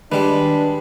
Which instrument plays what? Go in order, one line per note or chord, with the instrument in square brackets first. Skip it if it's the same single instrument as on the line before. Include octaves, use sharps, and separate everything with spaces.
[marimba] D#3 [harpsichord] G3 G#3 [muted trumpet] D4 [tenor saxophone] B4